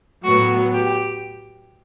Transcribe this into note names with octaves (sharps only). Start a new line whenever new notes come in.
A2 F#3 B3 F#4
G4